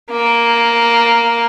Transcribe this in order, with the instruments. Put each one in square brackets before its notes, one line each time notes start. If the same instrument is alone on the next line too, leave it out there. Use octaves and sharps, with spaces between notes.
[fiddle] A#3